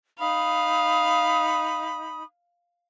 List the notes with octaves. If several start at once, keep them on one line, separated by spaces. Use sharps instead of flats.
D#4 F5 B5 D#6